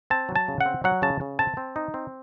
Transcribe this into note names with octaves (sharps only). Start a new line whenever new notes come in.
C4 A5
F#3
A5
C#3
F#5
C4
F#3 F#5
C#3 A5
C#3
C4 A5
C4
D#4
C4